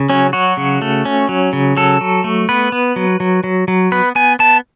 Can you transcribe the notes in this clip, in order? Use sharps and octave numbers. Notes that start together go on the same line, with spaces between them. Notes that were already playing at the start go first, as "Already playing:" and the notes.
Already playing: C#3
F#3 C#4
F#3 F#4
C#3
A3
C#4
F#3
C#3
F#3 A4
F#3
A3
B3 B4
B3
F#3
F#3
F#3
F#3
B3 B4
B3 G#5
B3 A5